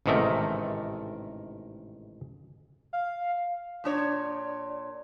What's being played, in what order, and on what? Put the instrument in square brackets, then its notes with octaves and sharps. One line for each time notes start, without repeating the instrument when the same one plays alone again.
[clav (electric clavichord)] A1 G#2 C3 D#3 A3 A#4
[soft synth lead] F5
[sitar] A#2 D4 C#5